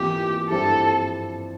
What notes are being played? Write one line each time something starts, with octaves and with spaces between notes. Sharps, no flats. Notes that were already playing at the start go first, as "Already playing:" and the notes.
Already playing: F2 E3 A#3 F4 G4
G2 F3 C4 E4 G4 A4